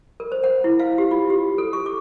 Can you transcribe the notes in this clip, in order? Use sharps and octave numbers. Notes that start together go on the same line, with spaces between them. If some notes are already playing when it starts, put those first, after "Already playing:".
A#4
C5
F#5
E4
F5
G4
F4
G4
A4
C#6
D6